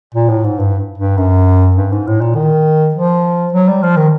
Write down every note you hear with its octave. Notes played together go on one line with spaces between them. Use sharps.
A#2
A2
G#2
G2
G2
F#2
G2
G#2
A2
A#2
D#3
F3
F#3
G3
F3
D#3